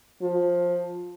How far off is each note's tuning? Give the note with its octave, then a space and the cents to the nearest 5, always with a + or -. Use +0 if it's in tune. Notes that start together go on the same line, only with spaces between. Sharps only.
F3 +15